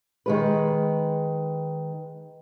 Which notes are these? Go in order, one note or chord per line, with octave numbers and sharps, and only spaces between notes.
D#3 G#3 B4